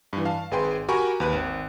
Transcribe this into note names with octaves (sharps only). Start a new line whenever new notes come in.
G2 E3
F5 A5
G#1 G#4 B4 G5 C6
F#4 G4 A#4 G#5 B5 C#6
D#2 B4 F#6
G#1